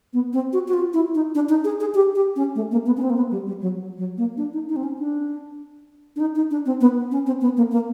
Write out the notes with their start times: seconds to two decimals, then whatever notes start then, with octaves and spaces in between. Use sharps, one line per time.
0.13 B3
0.33 C4
0.53 F#4
0.68 F#4
0.73 F4
0.93 E4
1.15 D#4
1.35 D4
1.49 D#4
1.64 G#4
1.80 G#4
1.95 G4
2.15 G4
2.36 C#4
2.55 A3
2.71 A#3
2.86 B3
2.97 C#4
3.02 C4
3.10 A#3
3.17 B3
3.31 G3
3.47 G3
3.62 F#3
3.98 F#3
4.18 A#3
4.37 D4
4.53 D#4
4.69 D#4
4.76 C4
4.83 C#4
4.98 D4
6.16 D4
6.20 D#4
6.35 D#4
6.51 D4
6.66 C4
6.81 B3
7.12 C#4
7.26 C4
7.41 B3
7.57 A#3
7.72 A#3